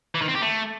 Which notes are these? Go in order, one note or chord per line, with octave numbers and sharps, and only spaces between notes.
E3
D#3
C4
G4
A3